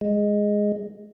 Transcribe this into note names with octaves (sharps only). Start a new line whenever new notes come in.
G#3